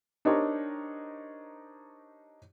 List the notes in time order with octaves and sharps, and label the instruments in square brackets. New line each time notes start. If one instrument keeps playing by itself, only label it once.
[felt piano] D4 D#4 G4 A#4 C5 C#5